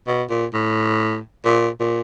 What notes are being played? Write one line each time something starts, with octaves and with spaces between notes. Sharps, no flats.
B2
A#2
A2
A#2
A#2